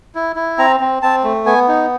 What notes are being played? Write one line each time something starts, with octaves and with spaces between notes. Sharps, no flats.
E4
E4
C4 A#5
C4
C4 A5
A3
B3 G#5
D#4